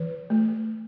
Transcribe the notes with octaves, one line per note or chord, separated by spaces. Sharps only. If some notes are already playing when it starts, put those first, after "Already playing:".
Already playing: E3 B4
A3